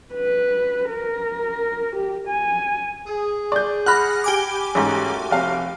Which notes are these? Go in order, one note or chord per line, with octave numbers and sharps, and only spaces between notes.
B4
A#4
G4
G#5
G#4
D5 G6
F#5 B5 F6 F#6 A#6
G4 G#5 D6
A1 G#2 A3 A#3 F#4
F1 F5